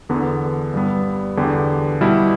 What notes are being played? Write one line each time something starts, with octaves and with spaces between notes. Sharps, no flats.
E2 D3 B3 D4
G2 G3 B3
E2 D3 B3 G4
B2 G3 E4